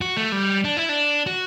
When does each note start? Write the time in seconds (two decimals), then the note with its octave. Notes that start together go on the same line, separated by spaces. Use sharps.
0.01 F#4
0.17 A3
0.32 G3
0.64 D4
0.77 E4
0.89 D4
1.26 F#4